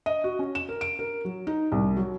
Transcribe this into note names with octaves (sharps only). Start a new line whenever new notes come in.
D#5
F#4
C#4
E7
A#4
D7
A#4
F#3
D#4
C2
F#3